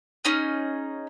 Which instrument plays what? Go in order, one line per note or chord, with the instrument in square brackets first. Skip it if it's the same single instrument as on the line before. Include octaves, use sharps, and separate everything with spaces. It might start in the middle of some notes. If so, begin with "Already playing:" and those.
[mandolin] C#4 D#4 G#4